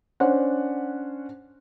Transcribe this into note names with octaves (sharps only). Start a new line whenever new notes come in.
C#4 D4 C5 F#5